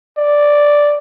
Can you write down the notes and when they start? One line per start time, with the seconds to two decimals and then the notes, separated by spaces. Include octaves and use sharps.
0.18 D5